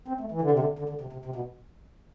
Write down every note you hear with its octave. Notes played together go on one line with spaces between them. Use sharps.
C4
A3
E3
D3
C3
D3
D3
D3
C3
C3
C3
B2